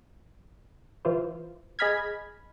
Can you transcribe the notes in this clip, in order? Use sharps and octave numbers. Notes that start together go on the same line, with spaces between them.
E3 F4 C5
G#4 D#5 G#5 B5 F6 G#6